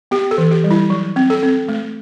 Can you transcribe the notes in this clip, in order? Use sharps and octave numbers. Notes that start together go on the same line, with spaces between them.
B3 G4
A4
E3
G4
G3
E4
F#3
C4
A4
C4
A3